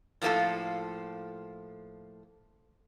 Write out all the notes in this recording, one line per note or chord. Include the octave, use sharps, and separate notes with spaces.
A2 F3 A#3 C4 F4 A4